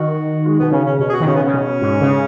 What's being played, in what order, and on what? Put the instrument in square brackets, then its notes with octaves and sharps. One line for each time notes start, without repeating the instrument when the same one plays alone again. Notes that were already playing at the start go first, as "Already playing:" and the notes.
Already playing: [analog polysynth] D#3 [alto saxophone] F#4
[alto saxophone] G#3
[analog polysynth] B2 [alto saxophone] B3
[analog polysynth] C#3 [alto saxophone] C#4
[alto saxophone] C#4
[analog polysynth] B2 [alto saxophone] C#4
[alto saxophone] G#4
F#4
[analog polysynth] D#3
[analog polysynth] C#3 [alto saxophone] C#4
[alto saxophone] B3
[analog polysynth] C#3 [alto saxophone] C#4
[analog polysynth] B2
G#2
C#3